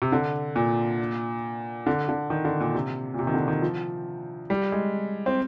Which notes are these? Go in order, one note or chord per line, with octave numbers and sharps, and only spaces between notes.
C3
D3
A#2
D3
D3
D#3
D3
A#2
C3
A#2
C3
D#3
D3
D#3
F3
G3
G#3
C4